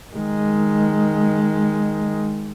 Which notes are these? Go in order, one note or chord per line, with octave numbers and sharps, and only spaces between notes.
D#3 G#3